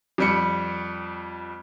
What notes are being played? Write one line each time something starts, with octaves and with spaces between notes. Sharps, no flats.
F2 G3 C#7